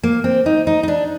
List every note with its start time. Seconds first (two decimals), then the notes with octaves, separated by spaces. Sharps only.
0.03 A#3
0.24 C4
0.46 D#4
0.67 D#4
0.83 D#4
0.88 D4